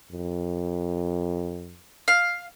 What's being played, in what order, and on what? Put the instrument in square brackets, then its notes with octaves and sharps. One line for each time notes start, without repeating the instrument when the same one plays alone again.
[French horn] F2
[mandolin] F5